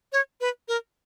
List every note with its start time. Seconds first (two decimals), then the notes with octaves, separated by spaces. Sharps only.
0.12 C#5
0.41 B4
0.68 A#4